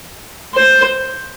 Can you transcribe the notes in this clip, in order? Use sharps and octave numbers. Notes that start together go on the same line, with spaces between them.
C5